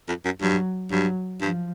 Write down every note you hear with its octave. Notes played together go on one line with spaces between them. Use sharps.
F2
F#2
G2 F#3
G2 F#3
G2 F3